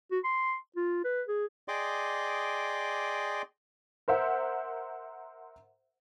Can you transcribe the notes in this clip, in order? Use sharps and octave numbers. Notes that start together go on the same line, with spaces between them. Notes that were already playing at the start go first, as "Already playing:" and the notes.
F#4
C6
F4
B4
G#4
G#4 D5 D#5 G5 C6 D6
A#4 C5 E5 F#5